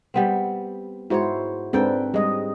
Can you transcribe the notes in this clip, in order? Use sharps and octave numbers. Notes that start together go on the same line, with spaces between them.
G3 B3 C4
G#2 E4 F#4 C5 C#5
G#2 C4 D4 A4 B4 G5
G3 G#3 D#5